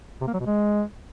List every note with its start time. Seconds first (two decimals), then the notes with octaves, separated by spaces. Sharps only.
0.21 C3
0.27 A#3
0.33 F#3
0.40 B2
0.46 G#3